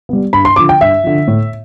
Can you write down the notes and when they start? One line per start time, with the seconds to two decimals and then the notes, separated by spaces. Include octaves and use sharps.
0.09 G3 B3
0.33 G2 B5
0.45 C6
0.56 D3 F3 D6
0.69 G5
0.81 G2 E5
1.04 D3 F3
1.28 A2